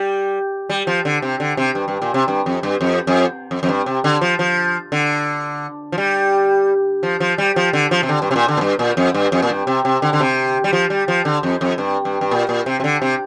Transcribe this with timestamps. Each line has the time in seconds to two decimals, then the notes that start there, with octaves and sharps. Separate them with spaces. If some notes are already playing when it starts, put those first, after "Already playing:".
Already playing: G3
0.70 G3
0.87 F3
1.05 D3
1.22 C3
1.40 D3
1.57 C3
1.75 G2
1.88 G2
2.02 A#2
2.14 C3
2.28 G2
2.46 F2
2.63 G2
2.81 F2
3.07 F2
3.51 F2
3.63 F2
3.69 G2
3.86 C3
4.04 D3
4.21 F3
4.39 F3
4.92 D3
5.92 F3
5.98 G3
7.03 F3
7.20 F3
7.38 G3
7.56 F3
7.73 D3
7.91 F3
8.03 C3
8.09 D3
8.22 G2
8.31 C3
8.36 A#2
8.48 D3
8.57 A#2
8.61 G2
8.79 A#2
8.97 F2
9.14 G2
9.32 F2
9.42 A#2
9.50 G2
9.67 C3
9.85 C3
10.02 D3
10.13 D3
10.20 C3
10.64 G3
10.73 F3
10.90 G3
11.08 F3
11.25 D3
11.43 F2
11.61 F2
11.78 G2
12.05 G2
12.21 G2
12.31 A#2
12.49 A#2
12.66 C3
12.80 C3
12.84 D3
13.02 C3